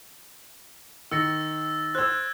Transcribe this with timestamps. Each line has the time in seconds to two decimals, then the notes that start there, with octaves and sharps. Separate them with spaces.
1.11 D#3 E6 A6 A#6 C#7
1.95 C5 E6 F#6 G#6